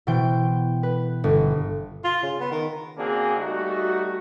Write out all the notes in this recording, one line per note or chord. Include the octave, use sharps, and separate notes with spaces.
B2 E3 C5 G5
B4
G1
F4
C#3
B3
D#3
C#3 A#3 C4 D4 F#4 G#4
G3 A3 D#4 F#4